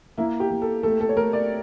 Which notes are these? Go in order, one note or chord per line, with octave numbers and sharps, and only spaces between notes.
A#3 E4
G4
A#3
A4
A3 A4
A4
C#5
A3 A#4
D5